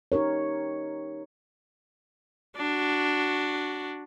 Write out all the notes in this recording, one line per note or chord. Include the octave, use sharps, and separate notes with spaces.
D#4 G4 A#4 C#5
D4 F#4